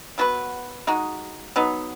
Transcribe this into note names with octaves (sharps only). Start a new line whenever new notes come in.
F#3 B3 F#4 B4
G#3 D#4 F#4
F#3 B3 D#4